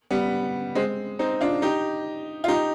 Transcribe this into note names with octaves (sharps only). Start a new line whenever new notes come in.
G3 B3
G#3 C4
C4 D#4
D4 F4
D#4 G4
F4
D#4 G4